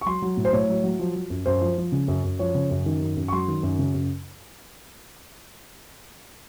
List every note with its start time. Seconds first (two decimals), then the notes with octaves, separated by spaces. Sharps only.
0.01 C#6
0.06 F#3 C6
0.22 F#3
0.37 A2
0.45 C5
0.53 A2 C#5
0.69 F#3
0.84 F#3
1.00 F3
1.16 F3
1.30 F#2
1.46 F#2 C5
1.61 F3
1.78 F3
1.92 C#3
2.08 F#2
2.24 F#2
2.39 F3 C#5
2.55 C#3
2.71 F#2
2.86 D#3
3.01 F#2
3.17 F#2
3.28 C#6
3.33 F#3 C6
3.48 D#3
3.63 F#2
3.79 C#3
3.95 F#2